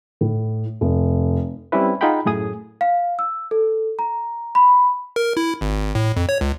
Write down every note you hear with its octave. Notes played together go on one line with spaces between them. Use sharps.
A2
F1
G3 C4 C#4 E4 B4
D#4 F4 G#4 F#5 G5 B5
F#2 A2 G#4 D#6
F5
E6
A4
A#5
B5
A#4
E4
G#1
A2
F2
C#5
C#2